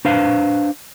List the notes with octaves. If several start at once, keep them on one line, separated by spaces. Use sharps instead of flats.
D4 B4 C5 F5